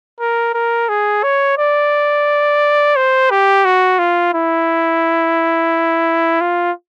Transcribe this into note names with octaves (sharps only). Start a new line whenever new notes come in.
A#4
A#4
G#4
C#5
D5
C5
G4
F#4
F4
E4
F4